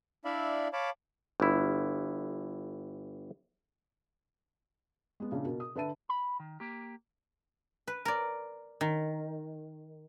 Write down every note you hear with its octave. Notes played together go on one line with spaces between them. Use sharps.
D4 E4 D5 E5 F5 B5
C#5 F5 A5 B5 D6
G1 E4
G#3 B3
A#1 C#3 D4
B2 A#4
D#6
D3 B4 E5 A5 D#7
B5
D#3
A#3 G4
B4
A#4 D5
D#3